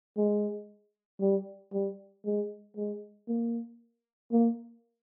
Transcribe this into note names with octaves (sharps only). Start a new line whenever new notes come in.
G#3
G3
G3
G#3
G#3
A#3
A#3